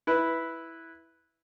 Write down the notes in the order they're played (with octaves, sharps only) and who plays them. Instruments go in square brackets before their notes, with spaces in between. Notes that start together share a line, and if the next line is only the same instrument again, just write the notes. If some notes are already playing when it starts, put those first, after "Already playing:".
[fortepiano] E4 B4